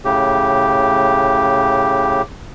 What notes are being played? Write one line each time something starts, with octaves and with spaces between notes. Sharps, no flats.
A2 C#3 G4